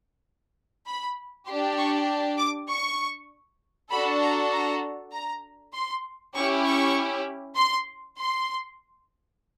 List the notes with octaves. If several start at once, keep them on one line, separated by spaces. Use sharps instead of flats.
B5
D4 G4 C6
C#6
D6
C#6
D4 F#4 A4 B5
A#5
A#5
A#5
C6
C#4 E4 G4 C#6
C#6
C6
C6